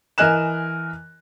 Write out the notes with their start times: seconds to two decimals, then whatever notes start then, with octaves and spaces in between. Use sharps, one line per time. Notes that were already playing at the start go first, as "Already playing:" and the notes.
0.18 E3 A#4 D#5 G#5 F#6 E7